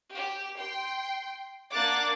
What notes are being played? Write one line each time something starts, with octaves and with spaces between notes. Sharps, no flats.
G4
G5 C6
A#3 D4 F#5 D6 F#6 A6